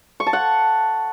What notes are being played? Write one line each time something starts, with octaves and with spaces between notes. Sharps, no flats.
C#6
A5
F#5